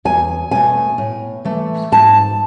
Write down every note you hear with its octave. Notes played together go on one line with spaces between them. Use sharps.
E2 G#5
B2 A3 G#5
A2
E3 A3
G#2 A5